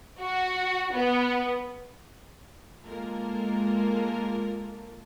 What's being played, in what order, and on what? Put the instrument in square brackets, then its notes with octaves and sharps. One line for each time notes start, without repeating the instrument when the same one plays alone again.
[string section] F#4
B3
G#3 A#3 F4 A4 A#4